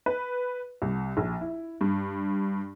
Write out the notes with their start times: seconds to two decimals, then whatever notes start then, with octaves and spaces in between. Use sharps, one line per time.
0.06 B4
0.82 C2
1.17 A#1
1.41 E4
1.81 G2